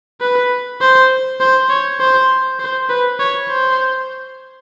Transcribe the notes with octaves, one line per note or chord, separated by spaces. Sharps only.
B4
C5
C5
C#5
C5
C5
B4
C#5
C5